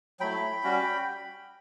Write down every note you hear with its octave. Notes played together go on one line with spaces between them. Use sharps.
F#3 A3 E4 G5 B5
G3 C#4 F#4